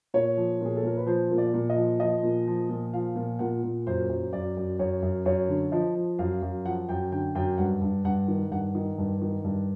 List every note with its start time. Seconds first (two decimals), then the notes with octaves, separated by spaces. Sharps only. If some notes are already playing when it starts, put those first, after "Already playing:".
0.14 A#2 C#5
0.37 F3
0.61 A#2 G#4
0.76 A4
0.83 A#2 A#4
0.97 B4
1.06 F3 C5
1.31 A#2
1.38 D5
1.54 A#2
1.70 D#5
1.76 F3
2.00 F3 D#5
2.23 A#2
2.47 F3
2.69 A#2
2.93 F3 F5
3.16 A#2
3.39 A#2 F#5
3.63 A#2
3.87 F#2 C5
4.09 F#2
4.33 F#2 D5
4.57 F#2
4.79 F#2 C#5
5.02 F#2
5.25 F#2 C#5
5.49 D3
5.72 F3 D#5
5.95 F3
6.19 F#2 F5
6.42 F#2
6.65 F3 F#5
6.89 F#2 G5
7.12 D3 G5
7.35 F#2 G5
7.58 G2 F#5
7.81 G2
8.04 G2 F#5
8.28 D#3
8.51 G2 F#5
8.75 D#3
8.98 G2
9.22 D#3
9.44 G2